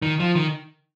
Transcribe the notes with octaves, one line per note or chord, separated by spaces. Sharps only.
D#3
F3
D#3